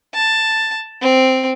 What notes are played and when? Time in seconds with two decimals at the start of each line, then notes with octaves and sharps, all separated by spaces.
0.14 A5
1.01 C4